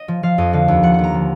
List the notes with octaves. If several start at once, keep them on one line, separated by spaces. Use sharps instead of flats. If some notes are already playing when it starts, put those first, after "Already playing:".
Already playing: D#5
F3
F3 F5
F2 D#5
D3 F5
D#2
F3 F#5
D#2 F#5
A#5
F3